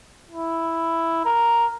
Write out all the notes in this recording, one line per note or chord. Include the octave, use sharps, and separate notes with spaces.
E4
A#4